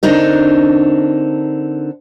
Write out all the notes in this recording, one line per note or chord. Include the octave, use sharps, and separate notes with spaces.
D3 C4 D4 D#4 A#4